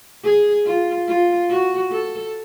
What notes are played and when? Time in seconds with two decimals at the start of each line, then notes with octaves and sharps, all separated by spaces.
0.23 G#4
0.65 F4
1.07 F4
1.49 F#4
1.91 A4